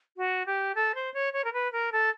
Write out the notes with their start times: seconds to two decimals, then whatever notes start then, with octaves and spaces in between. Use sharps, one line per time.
0.17 F#4
0.46 G4
0.75 A4
0.95 C5
1.14 C#5
1.33 C#5
1.44 A#4
1.53 B4
1.72 A#4
1.92 A4